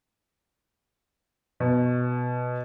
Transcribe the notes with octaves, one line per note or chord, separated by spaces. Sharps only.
B2